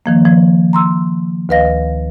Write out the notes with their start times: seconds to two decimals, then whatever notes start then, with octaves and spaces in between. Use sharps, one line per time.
0.06 D#3 F3 A#3
0.25 F3
0.73 A#5 C6 E6
1.49 D2 D#3 B4 D#5 F5 A#6